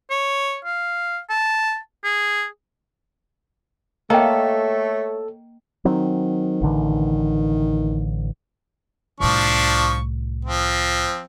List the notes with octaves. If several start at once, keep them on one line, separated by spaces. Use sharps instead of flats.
C#5
F5
A5
G#4
A3 A#3 A4 C#5 D#5 G5
D#3 F#3 C4
A1 D3 E3
C2 A2 F3 D4 C#6
F3 C4